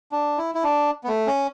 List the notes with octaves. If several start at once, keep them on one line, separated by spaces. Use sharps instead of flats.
D4
E4
E4
D4
B3
A3
C#4